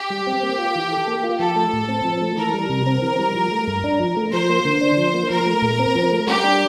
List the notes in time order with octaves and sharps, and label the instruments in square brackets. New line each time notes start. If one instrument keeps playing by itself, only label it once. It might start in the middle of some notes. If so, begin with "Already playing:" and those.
Already playing: [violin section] G4
[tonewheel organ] G3
C4
A#3
F4
E3
A4
A#3
F4
[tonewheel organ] F3 [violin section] A4
[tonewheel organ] A3
A2
C4
F3
A3
[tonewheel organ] E3 [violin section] A#4
[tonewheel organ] G3
C3
C4
E3
G3
F3
A3
G2
D4
F3
A3
[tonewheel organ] F3 [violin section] C5
[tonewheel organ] A#3
D3
D4
F3
A#3
[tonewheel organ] F3 [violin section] A#4
[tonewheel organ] A3
A#2
C4
F3
A3
[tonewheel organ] G3 [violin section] G4
[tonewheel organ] D4